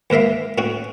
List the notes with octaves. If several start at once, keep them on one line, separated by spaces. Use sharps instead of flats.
D#2 G#2 A#4 E5 F5
A2 C#4 F#4